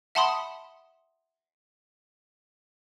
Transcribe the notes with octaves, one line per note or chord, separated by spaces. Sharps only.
E5 F#5 A5 B5 C6 D#6